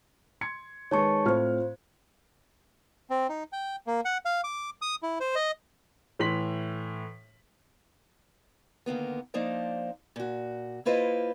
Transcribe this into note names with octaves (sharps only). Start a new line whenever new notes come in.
C6 G#6 C#7
D#3 G#3 B4 C#5 A5 C#6
A2 C4 F4 C5 F6
C4
D#4
G5
A#3
F#5
F5
D6
D#6
E4
C5
D#5
A2 E3 C6 B6 F#7
D3 D#3 A#3 B3
F3 A#3 D4 D#4 C5 D5
A#2 F#4
A#3 E4 F4 B4 C5 D#5